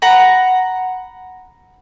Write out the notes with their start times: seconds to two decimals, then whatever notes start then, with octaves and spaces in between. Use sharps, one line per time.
0.02 F#5 A#5 B5